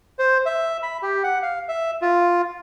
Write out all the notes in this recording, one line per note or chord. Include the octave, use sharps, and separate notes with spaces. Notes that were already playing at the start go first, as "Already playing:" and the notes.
C5
E5
B5
G4
F#5
F5
E5
F4